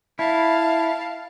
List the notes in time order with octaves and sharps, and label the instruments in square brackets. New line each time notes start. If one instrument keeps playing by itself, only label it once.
[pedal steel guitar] E4 [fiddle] F5 A5